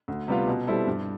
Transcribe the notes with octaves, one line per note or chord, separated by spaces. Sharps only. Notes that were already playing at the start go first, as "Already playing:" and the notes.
D2
C3 G3 B3 F4
B2
G3 C4 E4 A4
G2